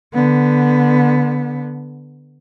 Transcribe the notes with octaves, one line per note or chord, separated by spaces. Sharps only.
D3 B3